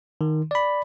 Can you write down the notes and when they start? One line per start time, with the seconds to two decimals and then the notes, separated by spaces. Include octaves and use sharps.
0.21 D#3
0.51 D5 B5